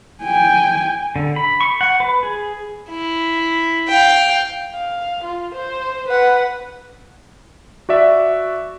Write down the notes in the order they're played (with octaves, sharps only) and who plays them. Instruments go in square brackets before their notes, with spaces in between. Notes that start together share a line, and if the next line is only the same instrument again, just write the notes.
[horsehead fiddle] G5 G#5
[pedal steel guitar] D3
B5
C#6
F#5
B4
G#4
[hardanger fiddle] E4
F5 G5
[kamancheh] F5
F4
C5
B4 F#5
[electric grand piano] F#4 D5 E5